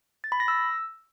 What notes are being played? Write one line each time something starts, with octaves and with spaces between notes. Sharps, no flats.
A6
B5
A#6
E6